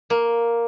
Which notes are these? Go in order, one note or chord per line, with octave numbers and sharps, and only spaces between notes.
A#3